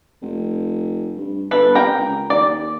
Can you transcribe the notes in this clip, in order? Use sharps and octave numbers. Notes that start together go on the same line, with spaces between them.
F1
G2
G1 A4 B4
C3 A#4 G5
C#2
D#2 D5